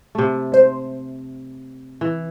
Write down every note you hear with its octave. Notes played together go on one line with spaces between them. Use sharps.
C3 A3
G#2 C5
E3